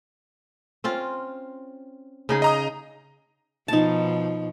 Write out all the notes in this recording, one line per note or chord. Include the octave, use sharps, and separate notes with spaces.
C4 C#4 F4
C#3 D#4 G#4
D#5 A#5 D#6
B2 F3 D#4 A5